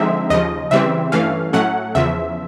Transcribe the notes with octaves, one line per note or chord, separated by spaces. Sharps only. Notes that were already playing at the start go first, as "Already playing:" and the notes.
Already playing: D3 F3 G#3 C4 D#4 E5
D#2 C#3 F3 D#5
C#3 E3 G3 C4 E5
G2 E3 A3 C#4 F5
A2 F#3 A3 C#4 F#5
E2 C#3 F3 E5